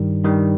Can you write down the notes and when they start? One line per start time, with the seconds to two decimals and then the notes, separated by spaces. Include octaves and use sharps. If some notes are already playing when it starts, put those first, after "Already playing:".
Already playing: G2 D#3 G3
0.24 G2 D#3 G3